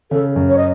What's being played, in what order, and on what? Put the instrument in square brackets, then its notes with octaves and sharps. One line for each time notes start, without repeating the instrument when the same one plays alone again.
[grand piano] C#3 [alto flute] A4
[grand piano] F#2
[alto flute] C#5
D#5